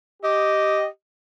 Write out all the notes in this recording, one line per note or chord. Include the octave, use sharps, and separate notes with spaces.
G4 D#5